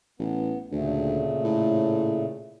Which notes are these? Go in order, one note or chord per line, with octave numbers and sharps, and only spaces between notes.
A1 B3
D2 A#2 C#3 A3
A2